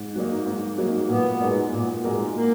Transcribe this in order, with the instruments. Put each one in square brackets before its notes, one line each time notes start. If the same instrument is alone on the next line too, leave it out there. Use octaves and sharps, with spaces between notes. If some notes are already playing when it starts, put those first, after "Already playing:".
Already playing: [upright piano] G#2
F#3 A#3 D#4
G#2
F#3 A#3 D#4
[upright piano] A#2 [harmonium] B3
[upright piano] G#3 D#4 F#4 A#4
A#2
G#3 D#4 F#4 A#4
[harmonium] A#3